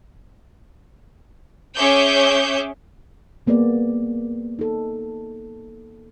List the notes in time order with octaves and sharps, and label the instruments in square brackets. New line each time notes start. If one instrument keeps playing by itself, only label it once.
[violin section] C#4 G#4 C#5 E5 D6 G6
[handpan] G3 A#3 B3 G#4 D5
D#4 A4